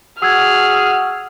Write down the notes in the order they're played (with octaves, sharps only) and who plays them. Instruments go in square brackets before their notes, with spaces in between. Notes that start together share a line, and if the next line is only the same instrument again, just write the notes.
[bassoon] F#4 [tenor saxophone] G#4 [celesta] E6 G#6 [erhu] F6